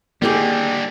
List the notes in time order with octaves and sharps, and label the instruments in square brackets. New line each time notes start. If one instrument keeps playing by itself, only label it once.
[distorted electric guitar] D3 G3 [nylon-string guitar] D#3 G4 G#4 [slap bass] A#3